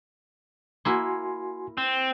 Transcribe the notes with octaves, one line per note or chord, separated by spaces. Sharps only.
A#3 E4 F#4 G#5 C6
C4